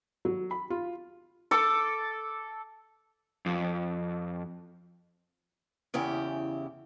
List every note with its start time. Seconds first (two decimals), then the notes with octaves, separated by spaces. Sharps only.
0.25 F#3
0.51 B5
0.70 F4
1.51 A4 D6
3.46 F2
5.94 E2 C#3 E4 G4